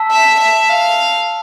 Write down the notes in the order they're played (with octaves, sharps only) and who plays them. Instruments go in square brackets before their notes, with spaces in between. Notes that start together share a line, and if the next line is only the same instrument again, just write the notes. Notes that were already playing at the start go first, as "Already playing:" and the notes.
Already playing: [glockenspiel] A5 E6 B6
[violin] E5
E5
F5